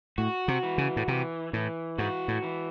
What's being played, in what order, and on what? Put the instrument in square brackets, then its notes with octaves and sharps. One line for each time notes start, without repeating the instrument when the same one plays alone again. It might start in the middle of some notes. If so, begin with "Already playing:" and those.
[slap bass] A2 [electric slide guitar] F#4
[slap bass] C3
[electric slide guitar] E3
[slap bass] C#3
A2
[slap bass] C3 [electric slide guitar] E3
[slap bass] A2 [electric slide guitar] E3
[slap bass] G#2 [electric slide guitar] F#4
[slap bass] A2
[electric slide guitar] E3